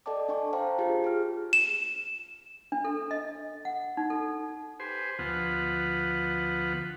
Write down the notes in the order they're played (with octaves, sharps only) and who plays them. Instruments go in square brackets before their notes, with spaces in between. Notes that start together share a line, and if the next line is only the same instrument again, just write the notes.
[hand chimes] A4 D5 D#5 G5 A5 D6
D4 G#5 A5 C#6
C5 F5 G5 A5 A#5
F4 G4 G#4
G#4 F6
[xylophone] E7
[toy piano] D4
A4
D#5
F#5
D#4
A4
[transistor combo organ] G4 B4 C5 G#5 C6
D2 F3 B3 F4 B4 F#5